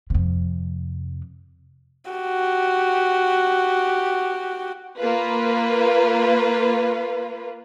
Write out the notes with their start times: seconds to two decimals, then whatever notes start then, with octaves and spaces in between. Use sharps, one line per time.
0.10 F2 C3
2.11 F#4 G4
4.98 A#3 F4 B4